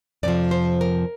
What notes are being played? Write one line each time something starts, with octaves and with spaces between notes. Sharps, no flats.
F2 C3 F3 D5
C5
A#4